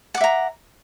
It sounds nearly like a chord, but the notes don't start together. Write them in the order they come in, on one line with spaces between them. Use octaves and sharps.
F#5 D6 E5 A#5